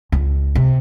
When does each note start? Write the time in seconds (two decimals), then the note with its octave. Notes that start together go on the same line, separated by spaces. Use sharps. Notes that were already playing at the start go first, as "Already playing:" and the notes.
0.12 C#2
0.55 C3